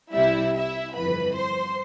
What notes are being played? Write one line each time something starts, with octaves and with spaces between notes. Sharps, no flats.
C2 C3 G3 E4 E5
E4 E5
G1 F2 E3 B4 B5
C5 C6